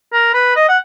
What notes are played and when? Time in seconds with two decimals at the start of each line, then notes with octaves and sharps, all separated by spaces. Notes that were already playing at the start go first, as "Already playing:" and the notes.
0.13 A#4
0.34 B4
0.56 D#5
0.69 F#5